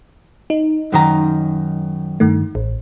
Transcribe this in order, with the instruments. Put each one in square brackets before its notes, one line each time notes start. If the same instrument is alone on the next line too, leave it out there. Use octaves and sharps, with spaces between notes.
[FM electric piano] D#4
[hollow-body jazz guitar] F#2 D#3 A#5
[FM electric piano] G2 D#3 A3
A1